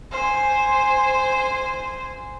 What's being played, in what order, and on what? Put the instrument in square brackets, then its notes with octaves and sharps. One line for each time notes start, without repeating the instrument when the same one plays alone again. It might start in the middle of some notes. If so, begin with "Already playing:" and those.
[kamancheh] C5 G#5